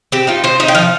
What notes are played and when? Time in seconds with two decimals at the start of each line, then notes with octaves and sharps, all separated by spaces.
0.12 C4 G4
0.27 D#4 F4
0.44 C4 C5
0.60 D#4 D#5
0.68 G5
0.75 F3 F5